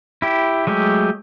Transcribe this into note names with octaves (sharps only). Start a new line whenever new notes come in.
E4 G4
F#3 G#3 A3 G4